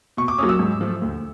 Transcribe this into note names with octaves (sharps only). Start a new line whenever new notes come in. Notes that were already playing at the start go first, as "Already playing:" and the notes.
B2 C#6
D6
F#3 A#3 C#4 D#6
E6
G#2
F3 A3
D2